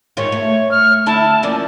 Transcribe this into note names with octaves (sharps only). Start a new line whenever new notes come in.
G#2 D#3 F4 C#5
A3
F6
D3 E4 A5
F3 A#3 C#4 D5